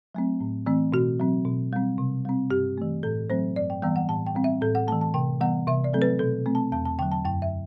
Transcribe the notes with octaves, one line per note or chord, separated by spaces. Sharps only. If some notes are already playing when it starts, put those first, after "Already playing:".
F#3 A3 C4
A2
E3 A3 C4
B2 F#4
F#3 C4
B2
G3 C4
C3
G3 C4
G2 G4
E3 A3
A2 A4
F#3 A3 C4 C5
G2 D5
G5
E3 G3 B3 G5
F#5
A2 A5
G5
G3 C4
E5
A2 A4
F#5
E3 A3 A5
A5
C3 G5
E3 G3 B3 F#5
C3 E5
D5
F#3 A3 C4 A4
B4
B2 A4
A3 C4
A5
E2 A5
A5
D3 F#3 G5
A5
F#2 G5
E5